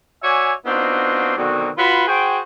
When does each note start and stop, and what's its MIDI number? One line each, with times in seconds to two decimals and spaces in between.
0.23 0.53 66
0.23 0.53 73
0.23 0.53 74
0.23 0.53 76
0.23 0.53 80
0.66 1.34 59
0.66 1.34 60
0.66 1.34 62
0.66 1.34 63
0.66 1.34 65
0.66 1.34 66
1.36 1.69 47
1.36 1.69 50
1.36 1.69 51
1.36 1.69 54
1.36 1.69 60
1.36 1.69 66
1.77 2.06 65
1.77 2.06 66
1.77 2.06 71
1.77 2.06 83
2.08 2.38 66
2.08 2.38 68
2.08 2.38 72
2.08 2.38 79